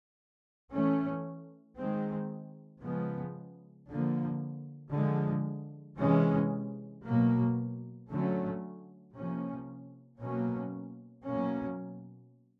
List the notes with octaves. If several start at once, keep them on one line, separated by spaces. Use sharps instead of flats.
E3 A3 C#4
D#3 G#3 C4
C#3 F3 G#3 B3
D3 F3 A#3
D3 F3 G#3
C3 E3 G#3 C#4
B2 F#3 A#3
D3 F#3 A3 C#4
C3 F3 A#3 C#4
B2 F#3 A#3 C#4
B2 F#3 A#3 C#4